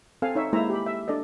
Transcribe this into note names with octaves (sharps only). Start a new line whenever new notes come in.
C4 A4 F5 G#5
D#4 C#5 E5
G#3 A#3 E4 C5 E5 A#5
G4 B5
E5
D4 A4 D5 D#5